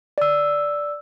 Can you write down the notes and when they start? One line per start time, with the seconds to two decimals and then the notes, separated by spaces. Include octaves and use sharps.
0.18 D5 E6